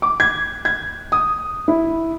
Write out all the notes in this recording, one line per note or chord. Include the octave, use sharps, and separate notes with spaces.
D6
G#6
G#6
D#6
E4